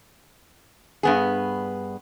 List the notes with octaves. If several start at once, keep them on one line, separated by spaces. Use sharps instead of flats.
G2 B3 G#4